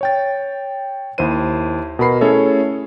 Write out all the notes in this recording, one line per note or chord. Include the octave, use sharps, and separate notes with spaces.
C#5 G5 A6
D#2 E4 C5 D#7
B2 A#4 B5 C7
A3 C#4 E4 G#4 A4 C#5